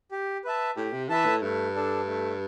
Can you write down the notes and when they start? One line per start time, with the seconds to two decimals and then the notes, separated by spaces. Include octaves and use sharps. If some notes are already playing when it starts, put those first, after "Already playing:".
0.11 G4
0.44 B4 E5 A5
0.76 A2 G4
0.93 C3
1.09 E3 B4 E5 A5
1.26 A2
1.42 G2 A3
1.75 D4 A4
2.07 A3